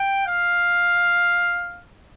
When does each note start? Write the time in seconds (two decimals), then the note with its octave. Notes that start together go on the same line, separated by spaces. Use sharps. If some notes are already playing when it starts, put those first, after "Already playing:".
Already playing: G5
0.27 F5